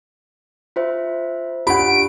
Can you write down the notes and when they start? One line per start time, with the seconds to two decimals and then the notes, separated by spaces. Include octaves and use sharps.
0.76 F4 C5 E5
1.67 D4 F4 G4 F#5 B5 D7